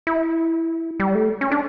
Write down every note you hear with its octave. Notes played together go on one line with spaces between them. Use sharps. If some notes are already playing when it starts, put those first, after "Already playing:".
E4
G3
A3
C#4
D4